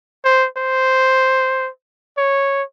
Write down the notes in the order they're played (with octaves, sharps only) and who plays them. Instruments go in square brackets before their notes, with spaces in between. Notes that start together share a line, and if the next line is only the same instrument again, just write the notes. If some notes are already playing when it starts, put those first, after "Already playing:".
[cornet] C5
C5
C#5